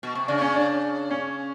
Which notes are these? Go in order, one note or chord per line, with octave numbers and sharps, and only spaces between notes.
B2
C3
C#3 D4
C#4
D4
C#4